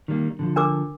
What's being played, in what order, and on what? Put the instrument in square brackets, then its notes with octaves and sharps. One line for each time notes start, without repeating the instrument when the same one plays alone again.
[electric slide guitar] D#3 G3 A#3
D3 D#3 F3
[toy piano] D4 A#4 D6